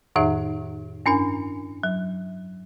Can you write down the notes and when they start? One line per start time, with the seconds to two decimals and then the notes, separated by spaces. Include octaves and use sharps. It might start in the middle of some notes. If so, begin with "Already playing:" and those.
0.16 F2 A2 D#3 D#4 G#4 E5
1.06 G2 C#4 D4 A#4 G#5
1.83 F#3